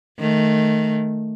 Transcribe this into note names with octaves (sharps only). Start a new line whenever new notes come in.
D#3 A3